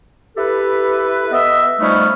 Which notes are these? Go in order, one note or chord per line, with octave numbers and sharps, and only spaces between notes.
E4 G4 A4 B4
B3 D#5 E5
F3 G3 A3 B3 C#4 D#4